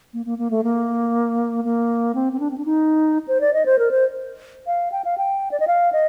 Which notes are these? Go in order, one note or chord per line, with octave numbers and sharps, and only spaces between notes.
A#3
A#3
A#3
A3
A#3
A#3
C4
C4
D4
C4
D4
D#4
C5
D5
D#5
C5
A#4
C5
F5
G5
F5
G5
D5
D#5
F5
D#5